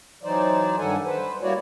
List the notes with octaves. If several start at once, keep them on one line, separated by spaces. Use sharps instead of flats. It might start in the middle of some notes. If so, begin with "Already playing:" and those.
E3 F#3 D#4 C5 D5
G2 D#3 G3 A4 F#5 G#5
B4 C5
G3 A#3 E4 F#4 C#5 D5